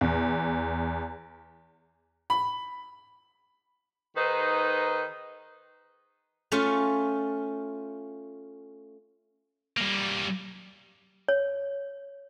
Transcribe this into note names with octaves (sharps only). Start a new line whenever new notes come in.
E2
B5
D#3 D#4 G#4 B4 C5
A3 C#4 F4
G3 A#3
C#5